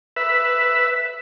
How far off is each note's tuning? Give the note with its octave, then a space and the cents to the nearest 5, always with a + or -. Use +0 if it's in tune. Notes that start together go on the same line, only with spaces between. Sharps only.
B4 +0 E5 +0